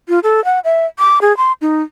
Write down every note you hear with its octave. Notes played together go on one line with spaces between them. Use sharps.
F4
A4
F#5
E5
D6
G#4
C6
D#4